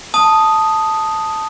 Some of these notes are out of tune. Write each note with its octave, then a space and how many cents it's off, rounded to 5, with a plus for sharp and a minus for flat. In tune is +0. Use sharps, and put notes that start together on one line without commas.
A5 +0 D#6 +0